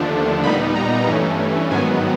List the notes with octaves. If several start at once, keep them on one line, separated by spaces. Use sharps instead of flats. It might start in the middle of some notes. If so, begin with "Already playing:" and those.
Already playing: D#2 D3 F3 A3 D4
A#2 G3 B3 D#4 B5
A#5
G2 E3 A3 C#4
G#2 D#3 F#3 B3 G#5